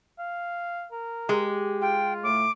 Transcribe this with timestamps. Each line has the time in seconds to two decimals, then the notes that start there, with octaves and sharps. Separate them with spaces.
0.19 F5
0.92 A#4
1.29 G#3 G4
1.81 F4 G5
2.23 A2 A3 D6